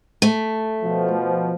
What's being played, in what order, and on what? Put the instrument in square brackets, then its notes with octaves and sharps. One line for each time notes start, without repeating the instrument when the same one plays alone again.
[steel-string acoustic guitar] A3
[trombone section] B2 F3